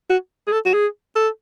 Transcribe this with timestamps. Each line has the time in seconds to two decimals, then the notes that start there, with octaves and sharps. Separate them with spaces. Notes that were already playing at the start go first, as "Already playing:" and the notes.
0.10 F#4
0.47 G#4
0.52 A4
0.65 F#4
0.73 G#4
1.16 A4